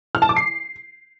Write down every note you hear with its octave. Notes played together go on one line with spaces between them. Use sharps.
F6
A5
D6
C7